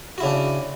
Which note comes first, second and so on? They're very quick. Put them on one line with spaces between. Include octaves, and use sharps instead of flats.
F#4 E4 C#3 D4